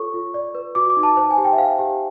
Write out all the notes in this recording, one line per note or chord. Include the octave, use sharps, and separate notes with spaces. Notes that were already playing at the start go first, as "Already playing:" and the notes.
Already playing: F4 A4 C#5 C#6
F4
D5
B4
F#4 D6
D6
D#4
A5
C5 A5
G#5
G4
G5
E5
C5 F5
G4